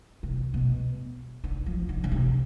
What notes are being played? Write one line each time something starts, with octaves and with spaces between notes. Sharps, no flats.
C3
B2
D3
F3
D3
D3
C3